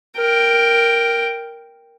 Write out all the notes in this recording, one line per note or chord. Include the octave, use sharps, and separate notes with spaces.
A#4 G5